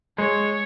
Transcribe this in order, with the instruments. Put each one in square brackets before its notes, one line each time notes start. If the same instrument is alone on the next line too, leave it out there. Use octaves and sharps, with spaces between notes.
[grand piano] G#3 [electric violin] C#5